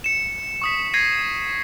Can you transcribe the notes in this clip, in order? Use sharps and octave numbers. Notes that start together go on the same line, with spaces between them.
C#7 E7
C#6 D#6 B6
G#6 A#6 C7 D#7